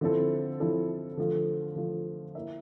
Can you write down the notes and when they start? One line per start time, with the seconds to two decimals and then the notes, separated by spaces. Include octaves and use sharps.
0.01 D3 F3 C4 E4 A4
0.60 D3 F3 C4 E4 A4
1.17 D3 F3 A3
1.76 D3 F3 A3
2.35 A#3 E4 A#4 E5